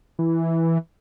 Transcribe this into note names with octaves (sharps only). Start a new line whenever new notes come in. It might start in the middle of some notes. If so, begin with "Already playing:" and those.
E3